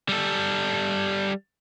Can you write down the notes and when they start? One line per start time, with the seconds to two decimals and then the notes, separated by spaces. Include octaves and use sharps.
0.09 G3 A4